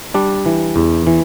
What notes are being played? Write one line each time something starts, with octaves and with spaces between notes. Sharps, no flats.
G3 D4 D5
E3
E2
E3